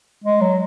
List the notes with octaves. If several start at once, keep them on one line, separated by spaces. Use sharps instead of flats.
G#3
F#3